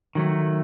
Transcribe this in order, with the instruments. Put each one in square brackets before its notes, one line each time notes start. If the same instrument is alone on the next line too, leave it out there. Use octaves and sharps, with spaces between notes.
[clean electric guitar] D#3 F#3 A3